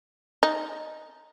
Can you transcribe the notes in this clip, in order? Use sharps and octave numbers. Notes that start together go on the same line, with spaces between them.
D#4